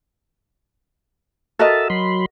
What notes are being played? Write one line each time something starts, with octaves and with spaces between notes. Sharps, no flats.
F#4 A4 A#4 D#5 E5 A5
F#3 B5 C6